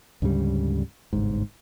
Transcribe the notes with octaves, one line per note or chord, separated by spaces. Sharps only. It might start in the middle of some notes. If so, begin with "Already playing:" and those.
D2 G#2 C#3 G3
G1 C2 G#2